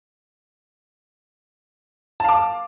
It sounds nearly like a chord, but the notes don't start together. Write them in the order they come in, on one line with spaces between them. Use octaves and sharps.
A5 F5 D6